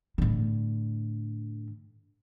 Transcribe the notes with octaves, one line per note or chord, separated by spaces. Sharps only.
A2 D3